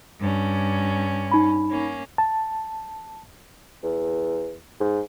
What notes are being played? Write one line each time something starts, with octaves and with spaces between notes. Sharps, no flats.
G2 C#4
D#4 B5
A#3 C#4
A5
E2
G#2